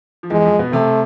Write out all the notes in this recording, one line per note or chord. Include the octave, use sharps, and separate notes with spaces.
F3
E2 E3 G#3
F2 F3
B2 B3
C3 A3 C4